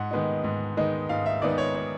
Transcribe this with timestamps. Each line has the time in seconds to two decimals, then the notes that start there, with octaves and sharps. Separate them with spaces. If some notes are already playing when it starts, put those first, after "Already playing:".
Already playing: G#2 F#5
0.11 D#3 G#3 B3 D#4
0.44 G#2
0.77 D#3 G#3 B3 D#4
1.09 G#2 F5
1.26 E5
1.42 D#3 G#3 B3 D#4 D5
1.58 C#5
1.75 C#5